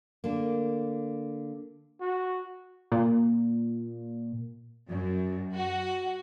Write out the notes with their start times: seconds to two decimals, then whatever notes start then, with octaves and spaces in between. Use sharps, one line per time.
0.24 D3 A#3
2.00 F#4
2.92 A#2
4.90 F#2
5.54 F#4